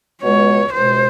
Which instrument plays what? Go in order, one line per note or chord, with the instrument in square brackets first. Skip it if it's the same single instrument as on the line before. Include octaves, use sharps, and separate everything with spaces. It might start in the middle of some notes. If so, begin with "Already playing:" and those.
[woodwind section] C#2 B2 G#3 [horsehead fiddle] C#5
[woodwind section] C#2 B2 G#3 [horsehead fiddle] C5